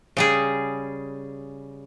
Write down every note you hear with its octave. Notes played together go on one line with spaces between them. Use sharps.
C#3 G3 G#4